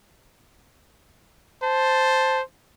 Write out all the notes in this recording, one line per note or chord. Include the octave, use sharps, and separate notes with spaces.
C5 A5